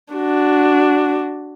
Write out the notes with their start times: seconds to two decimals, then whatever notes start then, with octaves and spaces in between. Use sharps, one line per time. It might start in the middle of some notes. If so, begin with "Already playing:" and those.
0.14 D4 F#4